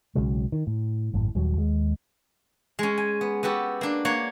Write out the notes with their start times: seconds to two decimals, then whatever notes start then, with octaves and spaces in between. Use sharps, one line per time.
0.15 B1 C#3 F#3 G#3
0.52 D#3
0.67 A2
1.14 G#1 F#2 A2
1.35 D#1 D#2 F#3 G3
1.57 D#2 G#3
2.79 G#3 C#4
2.98 G#5
3.21 B3
3.43 B3 F#4 G4 A4
3.81 A#3 D4
4.05 A#3 C#5 F#5